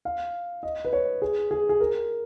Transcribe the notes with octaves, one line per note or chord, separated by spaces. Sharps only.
F5
D#5
B4
C#5
G#4
G#4
G#4
A#4